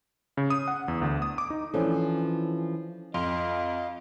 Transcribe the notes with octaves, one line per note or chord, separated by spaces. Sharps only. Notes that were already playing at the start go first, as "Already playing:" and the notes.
C#3
D#6
F#5
E2
D2
D#6
D6
D#4
E3 F3 C#4 D4 A4
F2 F4 D#5 F5